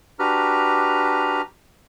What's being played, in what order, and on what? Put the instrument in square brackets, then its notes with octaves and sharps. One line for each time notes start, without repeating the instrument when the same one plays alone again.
[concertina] D4 F#4 G4 B4 A#5 F6